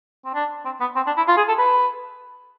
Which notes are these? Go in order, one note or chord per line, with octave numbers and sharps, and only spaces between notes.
C4
D4
C4
B3
C4
D4
E4
F4
G#4
A4
B4